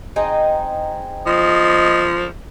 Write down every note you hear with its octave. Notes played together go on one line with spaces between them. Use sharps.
C4 D#4 G#4
F3 D#5